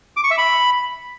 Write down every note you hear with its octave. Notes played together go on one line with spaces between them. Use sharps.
D6
C#6
E5
B5